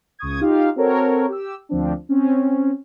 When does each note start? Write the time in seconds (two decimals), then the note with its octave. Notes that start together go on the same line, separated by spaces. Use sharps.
0.19 C#2 C#6 D#6 G#6
0.41 D#4 F4 G4 F5
0.76 C4 F#4 A4 A#4 C#5
1.28 G4 E6
1.69 D2 F3 C4 D4
2.09 C4 C#4